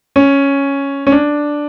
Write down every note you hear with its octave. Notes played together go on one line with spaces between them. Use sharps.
C#4
C#4
D4